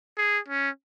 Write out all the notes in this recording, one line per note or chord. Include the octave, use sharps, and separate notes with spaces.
G#4
C#4